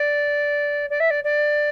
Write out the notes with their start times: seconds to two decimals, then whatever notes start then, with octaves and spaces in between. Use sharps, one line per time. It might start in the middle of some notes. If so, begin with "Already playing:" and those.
Already playing: D5
0.90 D5
1.00 E5
1.10 D5
1.24 D5